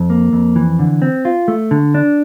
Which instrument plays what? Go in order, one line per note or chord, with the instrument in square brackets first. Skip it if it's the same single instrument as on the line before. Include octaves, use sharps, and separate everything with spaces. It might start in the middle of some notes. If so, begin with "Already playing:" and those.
Already playing: [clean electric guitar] F2
A#3
F2
E3
D3
C4
F4
A3
D3
D4